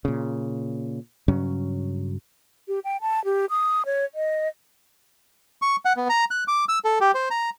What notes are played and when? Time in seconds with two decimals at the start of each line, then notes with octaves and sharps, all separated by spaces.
0.05 A#2 C#3
1.28 G2 C#3 F#3 C#4
2.68 G4
2.84 G5
3.01 A5
3.25 G4
3.50 D#6
3.86 C#5
4.15 D#5
5.62 C#6
5.85 F#5
5.97 B3
6.09 A#5
6.31 F#6
6.48 D6
6.69 E6
6.85 A4
7.01 G4
7.15 C5
7.31 A#5